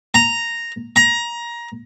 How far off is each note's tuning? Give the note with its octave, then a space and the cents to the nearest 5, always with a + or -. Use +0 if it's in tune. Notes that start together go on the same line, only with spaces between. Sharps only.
A#5 -5
A#5 +20